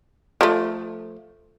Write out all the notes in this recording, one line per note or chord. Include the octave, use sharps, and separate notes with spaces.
F3 A3